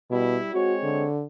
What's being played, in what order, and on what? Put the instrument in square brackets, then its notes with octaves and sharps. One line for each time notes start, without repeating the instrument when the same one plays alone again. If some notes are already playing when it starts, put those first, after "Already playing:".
[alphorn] B2 [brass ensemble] G3 E4
[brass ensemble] G#3 C4 C#5 [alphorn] F#4
[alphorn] D3